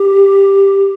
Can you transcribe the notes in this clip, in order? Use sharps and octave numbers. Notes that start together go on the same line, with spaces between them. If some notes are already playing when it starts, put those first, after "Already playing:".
Already playing: G4